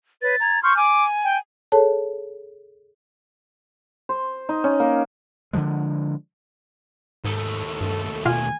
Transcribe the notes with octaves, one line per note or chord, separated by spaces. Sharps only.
B4 C#5 A6
A#5 G#6
C6 C#6 F6 G6
G#5 D6
G5
G#4 A4 C#5 A5
C5
D#4
C#4
A#3
D3 D#3 F3 G#3
D#2 G#2 A3
G2 A4
B2 F4 G#5